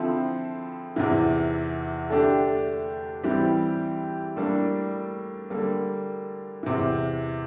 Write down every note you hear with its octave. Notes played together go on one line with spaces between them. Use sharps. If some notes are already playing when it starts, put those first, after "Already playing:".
Already playing: D3 F3 C4 E4 A4
E2 C3 E3
D3 A3 D4 G4
E3 G3 C4 E4 G4
A2 G3 A#3 D4
D3 G3 A#3
E2 C3 E3